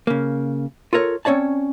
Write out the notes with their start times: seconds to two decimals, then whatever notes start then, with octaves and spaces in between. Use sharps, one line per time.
0.07 C#3 A#3
0.93 F4 A4 A#4 C#5
1.25 C4 C#4 C#5 D5 A5